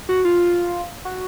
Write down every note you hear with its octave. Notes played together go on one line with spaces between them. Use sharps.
F#4
F4
F#4